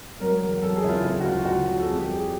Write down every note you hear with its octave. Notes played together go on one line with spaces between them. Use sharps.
F#3 A#4
E1
F#3 A4
G#4
C#3 E4
F4
D2 E4
F#4
D2 F4
D2 F#4
D2
A4
F2 G#4
G4
G3
G#4